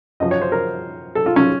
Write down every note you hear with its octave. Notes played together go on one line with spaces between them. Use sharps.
F#2 F3 D#5
C#5
C5
A#4
A4
F4
C#4